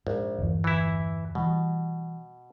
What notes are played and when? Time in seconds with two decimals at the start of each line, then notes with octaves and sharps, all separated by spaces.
0.07 A#1 G#2
0.38 G1 E2
0.64 E3 E4
1.35 B2 E3 G3